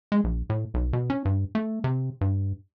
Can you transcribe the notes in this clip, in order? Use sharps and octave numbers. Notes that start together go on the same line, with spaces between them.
G#3
A#1
A2
B1
B2
C#4
G2
A3
C3
G2